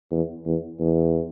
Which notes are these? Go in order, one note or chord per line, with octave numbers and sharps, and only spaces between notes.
E2
E2
E2